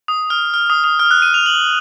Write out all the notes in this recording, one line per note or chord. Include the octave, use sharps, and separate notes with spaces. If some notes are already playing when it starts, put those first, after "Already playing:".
D#6
F6
F6
D#6
D#6
F6
F#6
D#7
F7
F#7